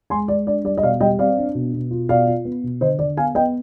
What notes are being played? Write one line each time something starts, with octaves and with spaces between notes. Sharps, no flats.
G#3 G#5 C6
G#3 D5
D4 D5
G3 D5
D#5
B2 D5 F5
G3 D#5 G5
C4 D5 F5
D4
B2
B2
F4
B2 D5 F5
F4
B3
B2
D3 C5 D#5
D3 D5
B3 F5 G#5
B3 D#5 G5